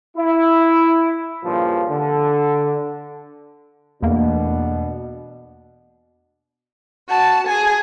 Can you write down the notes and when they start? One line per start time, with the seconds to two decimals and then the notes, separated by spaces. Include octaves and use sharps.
0.17 E4
1.44 G2 A#2 C#3 F3
1.89 D3
4.02 E2 B2 A3 A#3 D4
7.08 F#4 A5
7.47 G#4 G#5